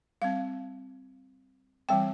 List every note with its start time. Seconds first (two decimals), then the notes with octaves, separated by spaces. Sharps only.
0.22 G3 C4 F5
1.89 E3 G3 C4 G5